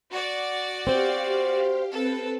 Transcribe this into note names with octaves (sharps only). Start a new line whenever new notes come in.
F#4 D5
C4 G4 C5 F5
C4 A4 B4